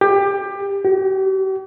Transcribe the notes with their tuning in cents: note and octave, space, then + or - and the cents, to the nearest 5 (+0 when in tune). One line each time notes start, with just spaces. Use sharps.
G4 +20
G4 -45